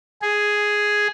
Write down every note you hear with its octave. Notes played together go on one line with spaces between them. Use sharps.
G#4